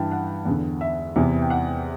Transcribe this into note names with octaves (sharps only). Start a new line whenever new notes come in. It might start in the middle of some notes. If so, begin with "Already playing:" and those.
Already playing: G2 E3 G5 A5
F#5
E2 D3
E5
E2 C3 E3
G5
F#5